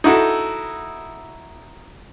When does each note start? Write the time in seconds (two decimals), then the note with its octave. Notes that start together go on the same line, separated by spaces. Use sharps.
0.04 D#4 E4 F#4 A4